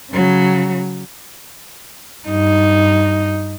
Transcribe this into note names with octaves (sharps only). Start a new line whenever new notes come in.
C#3 F#3
G2 D#4